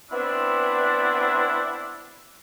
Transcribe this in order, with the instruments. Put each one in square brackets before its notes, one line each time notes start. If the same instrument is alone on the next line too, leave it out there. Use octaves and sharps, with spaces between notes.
[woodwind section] B3 C4 D4 E4